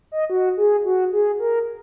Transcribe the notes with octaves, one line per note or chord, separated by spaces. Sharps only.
D#5
F#4
G#4
F#4
G#4
A#4